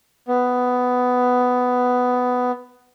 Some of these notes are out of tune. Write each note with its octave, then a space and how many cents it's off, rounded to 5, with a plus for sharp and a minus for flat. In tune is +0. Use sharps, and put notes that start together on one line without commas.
B3 +10